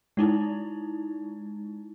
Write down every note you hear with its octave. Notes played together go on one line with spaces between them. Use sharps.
G#3 D#4 E4